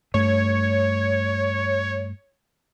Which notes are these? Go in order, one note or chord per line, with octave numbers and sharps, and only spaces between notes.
G2 A3 C#5